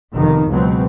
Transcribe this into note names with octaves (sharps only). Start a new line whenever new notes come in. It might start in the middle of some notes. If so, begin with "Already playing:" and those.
F1 B2 D#3
C#2 B2 F#3 C4